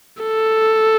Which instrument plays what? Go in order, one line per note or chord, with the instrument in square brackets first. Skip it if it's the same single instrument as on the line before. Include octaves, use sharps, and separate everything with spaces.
[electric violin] A4